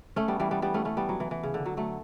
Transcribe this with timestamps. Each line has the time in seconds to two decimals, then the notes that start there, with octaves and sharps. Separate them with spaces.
0.16 A3 C#4
0.28 G3 B3
0.40 E3 G3
0.51 G3 B3
0.62 G3 B3
0.74 A3 C#4
0.85 A3 C#4
0.97 G3 B3
1.09 F#3
1.20 E3
1.31 E3
1.43 C#3
1.54 D3
1.66 F#3
1.77 F#3 A3